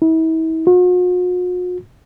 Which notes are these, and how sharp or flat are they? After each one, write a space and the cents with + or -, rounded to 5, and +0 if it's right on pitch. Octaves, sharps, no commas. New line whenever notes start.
E4 -40
F#4 -45